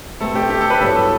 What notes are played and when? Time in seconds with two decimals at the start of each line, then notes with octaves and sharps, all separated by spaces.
0.20 B2 A3 C4 A4
0.35 G4
0.50 G4
0.61 A4
0.70 B4
0.81 G2 F#3 B3 E4 A4
0.96 A4